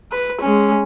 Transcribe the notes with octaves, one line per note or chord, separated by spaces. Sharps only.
B4
G#3 C#4